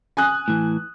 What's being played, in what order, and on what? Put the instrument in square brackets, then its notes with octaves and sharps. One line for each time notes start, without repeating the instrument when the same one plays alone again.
[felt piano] G#5 D#6 F#6
[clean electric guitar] A2 E3